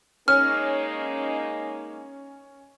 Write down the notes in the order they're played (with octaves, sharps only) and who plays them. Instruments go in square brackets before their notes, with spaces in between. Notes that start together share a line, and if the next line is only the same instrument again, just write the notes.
[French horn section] G#3 A#3 D#4 [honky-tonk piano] C#4 [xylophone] F6